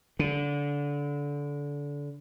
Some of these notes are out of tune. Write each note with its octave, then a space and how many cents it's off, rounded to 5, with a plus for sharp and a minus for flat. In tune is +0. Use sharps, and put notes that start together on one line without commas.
D3 -25